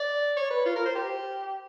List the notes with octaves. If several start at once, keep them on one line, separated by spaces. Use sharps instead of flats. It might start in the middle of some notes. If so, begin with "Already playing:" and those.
Already playing: D5
C#5
B4
F4
A#4
C5
G4